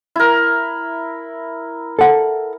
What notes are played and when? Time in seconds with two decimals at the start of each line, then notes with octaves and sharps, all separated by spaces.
0.16 E4 A#4
1.99 A4 F#5